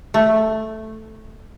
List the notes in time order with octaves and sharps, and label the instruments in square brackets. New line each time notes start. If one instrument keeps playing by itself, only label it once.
[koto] A3